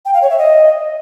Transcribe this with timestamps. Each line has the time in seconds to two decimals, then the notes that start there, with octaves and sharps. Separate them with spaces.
0.05 G5
0.13 F5
0.22 C#5
0.30 E5
0.38 D#5